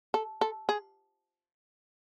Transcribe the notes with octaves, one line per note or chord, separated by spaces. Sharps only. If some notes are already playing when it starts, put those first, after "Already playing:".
A4
A4
G#4